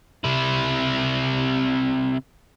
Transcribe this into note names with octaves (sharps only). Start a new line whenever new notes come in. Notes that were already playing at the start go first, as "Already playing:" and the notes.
C3 E4